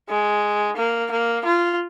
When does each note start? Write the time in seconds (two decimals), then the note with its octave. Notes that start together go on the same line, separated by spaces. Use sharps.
0.09 G#3
0.76 A#3
1.11 A#3
1.45 F4